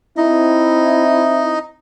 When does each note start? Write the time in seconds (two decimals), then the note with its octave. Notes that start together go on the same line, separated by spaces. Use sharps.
0.17 C4 D#4 E4 D#5